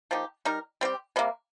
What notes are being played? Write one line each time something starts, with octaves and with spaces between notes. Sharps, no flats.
F3 A#3 D#4 G4
G3 D#4 A#4
G3 C4 G4
C3 G3 A#3